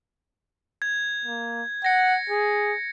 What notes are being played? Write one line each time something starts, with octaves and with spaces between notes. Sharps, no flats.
G#6
A#3
F#5 A#6 C#7
G#4